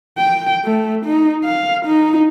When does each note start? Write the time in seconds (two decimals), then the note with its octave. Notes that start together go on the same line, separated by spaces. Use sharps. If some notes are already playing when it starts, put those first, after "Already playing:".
0.18 G5
0.65 A3
1.05 D#4
1.44 F5
1.85 D#4